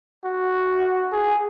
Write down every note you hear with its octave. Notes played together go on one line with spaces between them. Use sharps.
F#4
G#4